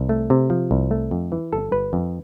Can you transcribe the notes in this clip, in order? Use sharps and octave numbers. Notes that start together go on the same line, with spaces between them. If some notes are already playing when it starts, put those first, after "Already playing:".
Already playing: C2
A3
C3
F3
C2
A3
F2
E3
G1 A4
G1 B4
F2